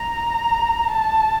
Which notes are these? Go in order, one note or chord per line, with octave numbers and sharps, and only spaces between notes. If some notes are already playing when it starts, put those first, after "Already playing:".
Already playing: A#5
A5